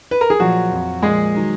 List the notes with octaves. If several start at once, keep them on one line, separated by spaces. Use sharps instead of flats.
B4
A#4
G#4
A#2 F3 F#3 F#4
F2 F3
A#2 F3 G#3 G#4
D#3 F#3